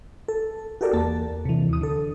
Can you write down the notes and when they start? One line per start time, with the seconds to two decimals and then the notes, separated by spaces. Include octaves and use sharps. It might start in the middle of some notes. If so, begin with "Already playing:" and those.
0.28 A4
0.81 F#4 G4 A4 A#4 D5
0.93 E2 A#3 A5
1.45 C3 E3
1.69 D#2 D#6
1.81 D3 A4